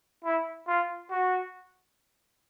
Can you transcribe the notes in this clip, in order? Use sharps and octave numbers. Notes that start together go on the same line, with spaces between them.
E4
F4
F#4